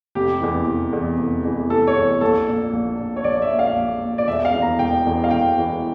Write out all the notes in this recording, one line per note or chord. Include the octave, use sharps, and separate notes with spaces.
F1 G4
E2 E3
F1
E2 E3
F1
E2 E3
F1 A4
C#5
E2 E3
A#1 A4
A#2
A#1
A#2
C#5
A#1 D5
E5
A#2
F5
A#1
A#2
D5
E1 E5
F5
E2 E3
A#5
E1 G5
E2 E3
F5
E1 G5
E2 E3